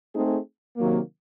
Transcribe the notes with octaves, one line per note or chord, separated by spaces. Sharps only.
A3 C4 D#4 G#4
C3 D#3 F#3 A#3